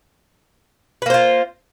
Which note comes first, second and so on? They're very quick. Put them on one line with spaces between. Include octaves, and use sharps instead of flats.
B4 A#3 C5 F4